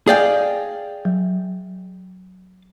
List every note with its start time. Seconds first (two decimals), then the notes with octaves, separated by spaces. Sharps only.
0.07 G#4 D5 D#5 F5 G5 G#5
1.05 F#3